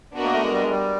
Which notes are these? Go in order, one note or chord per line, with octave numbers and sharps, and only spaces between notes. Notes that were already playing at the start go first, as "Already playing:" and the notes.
B3 D4 F#4 A#4 D#5
A#3
A3
G#3
G3
G#3
G3